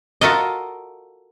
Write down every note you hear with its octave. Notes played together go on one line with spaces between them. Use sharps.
F4 F#4 A4 A#4 D#5